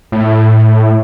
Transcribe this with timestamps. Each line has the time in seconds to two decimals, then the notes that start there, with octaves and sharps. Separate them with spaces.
0.12 A2